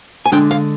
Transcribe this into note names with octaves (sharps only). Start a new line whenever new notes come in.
G#5
D3 G#3 D4 G5
F5